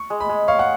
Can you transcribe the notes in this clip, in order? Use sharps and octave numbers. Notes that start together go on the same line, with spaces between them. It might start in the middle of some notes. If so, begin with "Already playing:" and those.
Already playing: C#6
G#3
B5
G#3
C#5 F5
F#5